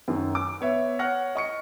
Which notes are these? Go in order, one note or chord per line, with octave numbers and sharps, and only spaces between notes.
F#2 D#3
D6
B3 C#5 E5
C#5 F#5 C#6 F6 A#6
D#5 C#6 C#7